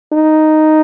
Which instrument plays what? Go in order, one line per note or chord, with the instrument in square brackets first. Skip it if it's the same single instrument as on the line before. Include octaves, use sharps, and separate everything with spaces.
[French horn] D#4